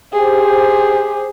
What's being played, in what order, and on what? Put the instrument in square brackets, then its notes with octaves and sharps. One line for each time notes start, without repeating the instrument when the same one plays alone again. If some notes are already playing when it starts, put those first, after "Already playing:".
[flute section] G4 C5 [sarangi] G#4